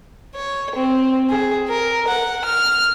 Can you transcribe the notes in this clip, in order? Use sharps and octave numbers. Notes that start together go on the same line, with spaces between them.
C#5
C4
G#4
A#4
F#5
F6